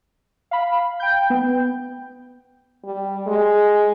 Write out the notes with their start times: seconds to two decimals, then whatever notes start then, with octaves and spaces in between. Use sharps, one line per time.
0.51 F5 B5
1.00 G5 G6
1.30 B3
2.84 G3
3.27 G#3